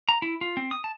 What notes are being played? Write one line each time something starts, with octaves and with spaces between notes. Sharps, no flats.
A#5
E4
F4
C4
D#6
A5